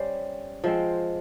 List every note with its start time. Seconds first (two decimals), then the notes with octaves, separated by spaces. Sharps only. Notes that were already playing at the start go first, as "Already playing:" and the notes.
Already playing: G3 C#4 G4 C5
0.64 F3 G#3 C4